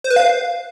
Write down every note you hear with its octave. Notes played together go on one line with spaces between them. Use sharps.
C5
B4
F5